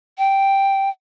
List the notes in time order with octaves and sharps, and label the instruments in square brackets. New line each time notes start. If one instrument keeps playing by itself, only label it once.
[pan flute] G5